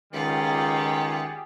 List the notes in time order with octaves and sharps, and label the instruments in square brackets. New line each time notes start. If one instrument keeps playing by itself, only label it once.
[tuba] C#2 [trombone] D#3 [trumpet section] G3 G4 G#4 [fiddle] F4 F#5